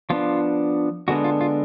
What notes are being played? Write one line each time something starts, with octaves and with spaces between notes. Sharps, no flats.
F3 B3 D4 F4
D3 G#3 B3 D4 F#4
F4
F4